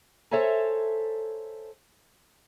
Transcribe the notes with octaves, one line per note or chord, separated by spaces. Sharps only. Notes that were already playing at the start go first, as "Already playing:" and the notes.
A4 C5 C#5 E5 G#5 A#5